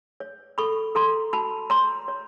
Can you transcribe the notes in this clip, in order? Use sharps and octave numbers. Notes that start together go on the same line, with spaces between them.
C#5
A4 B5 C#6
A4 A#5 C6
F#4 A5 B5
C#5 A#5 C6
C#5